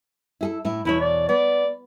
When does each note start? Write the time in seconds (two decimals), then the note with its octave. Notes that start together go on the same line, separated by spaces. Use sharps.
0.41 E4 G#4 A4
0.65 A2 E4
0.85 E2 B2 E4 C#5
1.01 D5
1.29 B3 D5